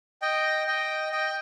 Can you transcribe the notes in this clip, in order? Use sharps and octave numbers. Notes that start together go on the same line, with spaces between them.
D#5 G5
D#5 G5
D#5 G5